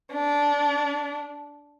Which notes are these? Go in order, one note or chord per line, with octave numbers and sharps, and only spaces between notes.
D4